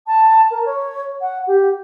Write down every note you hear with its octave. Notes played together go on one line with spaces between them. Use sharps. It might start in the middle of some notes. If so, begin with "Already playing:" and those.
A5
A#4
C#5
F#5
G4